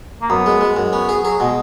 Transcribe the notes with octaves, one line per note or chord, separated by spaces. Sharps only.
A#3
F#2 B3
G#3
G#3
F#2
B3 C#4
G#4
F#3 G#4
B2 G#3